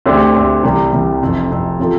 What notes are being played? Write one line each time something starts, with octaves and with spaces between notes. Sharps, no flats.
D2 D3 A3 C4 G4
D2 D3 A3 C4 G4
C2 C3 G3
C2 C3 G3
F1 F2 C3
F1 F2 C3
C3 F3 C4 F4 A4